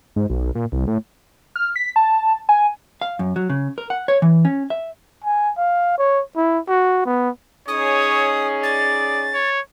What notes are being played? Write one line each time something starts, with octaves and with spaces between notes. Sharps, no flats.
G#2
B1
A#2
C2
A2
F6
B6
A5
G#5
F5
F#2
F#3
C#3
A#4
F#5
C#5
E3
C#4
E5
G#5
F5
C#5
E4
F#4
B3
C#4 D#4 G#4 C#5 D#6
D5 A6
C#5